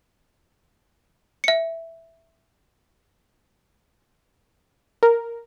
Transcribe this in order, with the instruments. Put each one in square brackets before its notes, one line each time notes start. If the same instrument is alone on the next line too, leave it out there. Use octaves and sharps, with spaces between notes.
[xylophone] E5 C#7
[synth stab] A#4